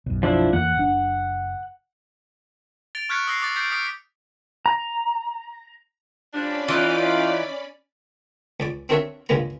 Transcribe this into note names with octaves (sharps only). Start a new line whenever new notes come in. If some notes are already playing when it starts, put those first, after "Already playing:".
B1 F#2
F3 D4 E4
F2 E3 A#3 F#5
F#1 D4
A6 D7 F7 G7
C#6 F6 F#6 G#6 B6 C#7
D#6 E6 A#6 C7
D6 A6
G6 A6 B6 C7 D7
D6 D#6 F6 B6 C#7 D7
A#5
F3 G3 C#4 D4 D5 B5
E3 D#4 F4 D6
C#2 D5 D6
C4 D4 F#4 A#4 C#5 E5
C#2 G2 C#3 G#3 A#3 A#5